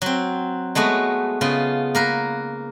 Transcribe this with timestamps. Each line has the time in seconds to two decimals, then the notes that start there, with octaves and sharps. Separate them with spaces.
0.02 F#3 C4
0.75 G#3 A3 B3 F#4
1.41 C#3 B3 F4
1.95 A#3 A#4 B4